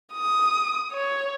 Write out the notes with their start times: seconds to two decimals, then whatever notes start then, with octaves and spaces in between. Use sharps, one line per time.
0.13 D#6
0.92 C#5